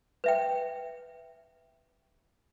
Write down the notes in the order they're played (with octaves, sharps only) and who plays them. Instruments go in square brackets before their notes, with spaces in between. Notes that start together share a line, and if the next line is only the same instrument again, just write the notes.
[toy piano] B4 E5 G5